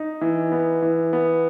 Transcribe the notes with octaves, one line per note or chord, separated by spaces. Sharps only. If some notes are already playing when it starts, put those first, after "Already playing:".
Already playing: D#4
E3
B3
E3
B3